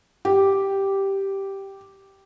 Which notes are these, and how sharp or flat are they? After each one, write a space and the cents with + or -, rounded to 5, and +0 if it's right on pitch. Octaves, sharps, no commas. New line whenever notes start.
G4 -5